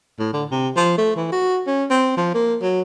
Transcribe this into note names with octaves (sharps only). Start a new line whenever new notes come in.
A2
D3
C3
F3
A3
E3
F#4
C#4
C4
F3
A#3
F#3